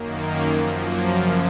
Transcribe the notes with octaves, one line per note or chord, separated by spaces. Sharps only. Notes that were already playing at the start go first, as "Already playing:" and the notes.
Already playing: F#2 D#3 A#3
F#2 F3
A#3
F#2 C#3 F3